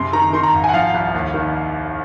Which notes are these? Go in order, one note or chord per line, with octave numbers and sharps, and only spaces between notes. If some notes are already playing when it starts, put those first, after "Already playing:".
Already playing: F#1 C3 C6
D#3 A#5
D#3 C6
A#5
G#1
F#5 G#5
F3 F5
C2
D#2
D#3